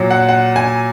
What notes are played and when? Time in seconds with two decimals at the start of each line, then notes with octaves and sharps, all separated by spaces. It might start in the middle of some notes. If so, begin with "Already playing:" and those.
Already playing: A#2 F#3
0.11 F#5
0.29 F#5
0.56 G#5